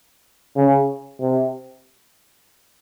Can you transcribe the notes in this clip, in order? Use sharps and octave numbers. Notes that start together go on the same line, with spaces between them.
C#3
C3